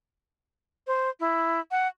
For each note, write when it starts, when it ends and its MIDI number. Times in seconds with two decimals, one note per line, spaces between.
0.87 1.10 72
1.20 1.60 64
1.71 1.88 78